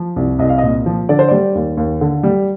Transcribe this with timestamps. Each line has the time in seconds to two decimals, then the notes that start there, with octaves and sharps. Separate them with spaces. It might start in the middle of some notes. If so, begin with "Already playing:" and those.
Already playing: F3
0.16 C2
0.39 C2 D#5
0.49 F5
0.58 A#2 D#5
0.86 F3
1.09 D3 D5
1.19 C5
1.28 G3 D5
1.55 D#2
1.77 D#2
2.01 D3
2.23 G3